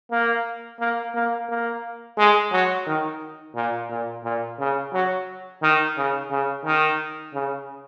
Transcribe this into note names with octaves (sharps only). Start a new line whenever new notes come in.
A#3
A#3
A#3
A#3
G#3
F#3
D#3
A#2
A#2
A#2
C#3
F#3
D#3
C#3
C#3
D#3
C#3